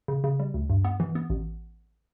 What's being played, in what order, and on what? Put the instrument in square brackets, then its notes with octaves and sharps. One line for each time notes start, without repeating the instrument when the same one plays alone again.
[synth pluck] C#3
C#3
G3
D2
G2
B3
E3
B3
A1